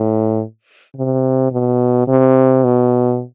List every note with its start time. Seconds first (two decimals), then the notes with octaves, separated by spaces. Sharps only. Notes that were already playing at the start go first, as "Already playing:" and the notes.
Already playing: A2
0.96 C3
1.52 B2
2.08 C3
2.64 B2